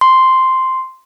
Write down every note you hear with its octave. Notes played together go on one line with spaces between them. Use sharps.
C6